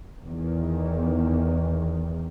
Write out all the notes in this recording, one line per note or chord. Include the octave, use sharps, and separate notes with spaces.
E2 D#3